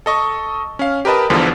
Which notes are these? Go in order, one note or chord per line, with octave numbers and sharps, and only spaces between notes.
A4 D#5 C#6
C#4 F5
G4 A#4 B4 D#5 A5
G1 E2 G2 D3 F3